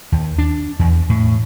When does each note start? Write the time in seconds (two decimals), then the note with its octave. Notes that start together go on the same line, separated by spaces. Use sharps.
0.12 D#2
0.38 D4
0.79 E2
1.10 A2